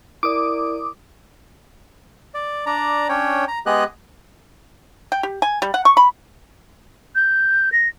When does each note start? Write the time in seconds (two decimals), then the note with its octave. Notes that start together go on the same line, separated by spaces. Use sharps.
0.23 E4 A#4 D5 D6 D#6
2.34 D5
2.66 D4 D5 A#5
3.09 C#4 D4 C#5 G5
3.48 A#5
3.66 G#3 B3 G4 G#4 D#5 F#6
5.12 G5
5.23 G4
5.42 G#5
5.62 G3
5.74 F#5
5.85 C#6
5.97 B5
7.15 G6
7.72 A#6